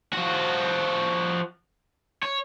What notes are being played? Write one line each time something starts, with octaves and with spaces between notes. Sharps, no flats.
F3 F#4
C#5